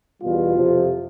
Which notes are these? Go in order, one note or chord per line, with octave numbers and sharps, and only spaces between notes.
E2 B2 G3 F4
F2 C3 F3